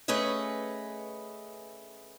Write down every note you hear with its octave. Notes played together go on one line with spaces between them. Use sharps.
A3 C#4 G#4 B4 D#5